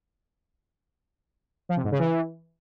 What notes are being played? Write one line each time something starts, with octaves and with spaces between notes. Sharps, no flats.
F3
C3
G#2
C#3
E3